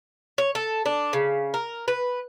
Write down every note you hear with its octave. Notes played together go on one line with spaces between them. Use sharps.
C#5
A4
D4
C#3
A#4
B4